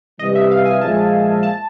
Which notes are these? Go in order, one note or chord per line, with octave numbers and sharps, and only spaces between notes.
C3 E3 G3 D#5
E5
F5
G#5
A#2 F3 G#3 A5
A5